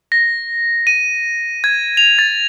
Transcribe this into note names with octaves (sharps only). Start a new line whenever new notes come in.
A#6
D#7
G#6
F7
A6